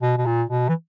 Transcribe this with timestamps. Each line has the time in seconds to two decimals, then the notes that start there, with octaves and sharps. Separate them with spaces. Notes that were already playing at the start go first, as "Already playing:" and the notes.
0.02 B2
0.18 B2
0.26 A#2
0.50 B2
0.69 E3